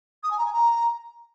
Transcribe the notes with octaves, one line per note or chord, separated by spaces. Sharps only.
D#6
G#5
A#5
G#5
A#5